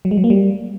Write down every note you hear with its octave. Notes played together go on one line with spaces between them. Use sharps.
F#3
G#3
F#3
A#3
G3